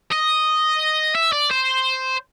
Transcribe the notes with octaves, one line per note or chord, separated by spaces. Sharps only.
D#5
E5
D5
C5